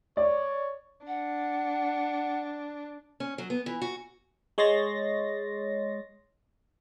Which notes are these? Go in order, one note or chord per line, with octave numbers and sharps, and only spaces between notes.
C#5 D5
D4 F#5
C#4
F#3
B3
E3
F#4
G#3 C#5 D#5 C6 A6 A#6